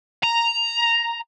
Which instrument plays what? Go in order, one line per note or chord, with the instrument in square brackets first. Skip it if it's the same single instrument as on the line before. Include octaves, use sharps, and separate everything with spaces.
[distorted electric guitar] A#5